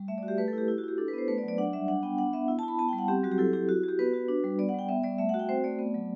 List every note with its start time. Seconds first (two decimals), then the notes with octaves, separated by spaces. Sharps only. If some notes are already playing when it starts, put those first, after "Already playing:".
Already playing: G3
0.08 A3 E5
0.18 D5
0.23 F#4
0.28 G4
0.38 A3 B4
0.48 A4
0.53 E4
0.58 G4
0.68 E4
0.78 F#4
0.84 E4 G4
0.98 D4 A4
1.08 B4
1.13 B3 C5
1.28 A3 B4
1.38 D5
1.43 F#3
1.48 D5
1.58 D4 F#5
1.73 G3 E5
1.88 D4 F#5
2.03 B3 G5
2.18 D4 F#5
2.33 B3 E5
2.48 E4
2.59 A5
2.63 E4 B5
2.78 B3 A5
2.89 G5
2.93 G3
2.98 F#5
3.08 C4 G4
3.24 F#3 F#4
3.32 G4
3.38 E4 A4
3.53 E4 G4
3.69 F#4
3.83 F#4 G4
3.99 B3 B4
4.14 F#4
4.29 D4
4.44 G3
4.59 B3 D5
4.69 F#5
4.74 G3 G5
4.89 B3 E5
5.03 G3 D5
5.18 A3 E5
5.29 F#5
5.34 F#4
5.39 G5
5.49 C4 C5
5.64 A3 D5
5.79 B3
5.94 F#3